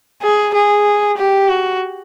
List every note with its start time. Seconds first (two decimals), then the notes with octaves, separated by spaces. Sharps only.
0.22 G#4
0.54 G#4
1.17 G4
1.49 F#4